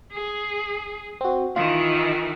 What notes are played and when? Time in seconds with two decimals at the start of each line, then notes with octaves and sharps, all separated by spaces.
0.12 G#4
1.21 C4 F#4
1.56 D#3 E3 F4